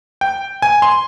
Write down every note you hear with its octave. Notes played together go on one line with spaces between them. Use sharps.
G5
G#5
C6